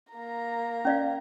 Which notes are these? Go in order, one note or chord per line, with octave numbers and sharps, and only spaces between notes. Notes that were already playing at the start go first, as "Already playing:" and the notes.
A#3 A#5
C#4 D5 F5